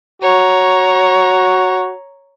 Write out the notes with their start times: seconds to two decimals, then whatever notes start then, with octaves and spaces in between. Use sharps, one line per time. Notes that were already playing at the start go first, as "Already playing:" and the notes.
0.22 F#4 C#5 A#5